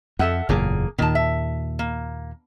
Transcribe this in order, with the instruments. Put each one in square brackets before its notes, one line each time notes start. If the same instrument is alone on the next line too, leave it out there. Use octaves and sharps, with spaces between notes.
[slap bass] F2 [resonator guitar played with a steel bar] A4 E5 F#5
[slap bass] F#1 E2 A#2 [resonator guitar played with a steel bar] A#3 G#4
[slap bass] D#2 A#2 [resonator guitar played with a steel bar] D#3 A5
[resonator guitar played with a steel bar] E5
A#3